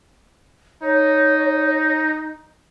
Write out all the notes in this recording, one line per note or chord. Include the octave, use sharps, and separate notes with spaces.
D#4 C#5